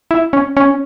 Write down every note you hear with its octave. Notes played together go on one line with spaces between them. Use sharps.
E4
C#4
C#4